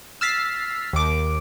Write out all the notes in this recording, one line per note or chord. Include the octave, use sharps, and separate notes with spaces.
E6 F6 A6 B6 C7
D#2 D6